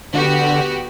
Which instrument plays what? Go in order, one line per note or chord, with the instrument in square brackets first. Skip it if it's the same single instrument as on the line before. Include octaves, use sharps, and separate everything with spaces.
[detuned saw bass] D3 [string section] B3 F#4 G4